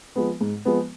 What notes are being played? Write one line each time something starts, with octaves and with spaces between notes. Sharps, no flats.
F3 G#3 B3
G#2
F3 G#3 B3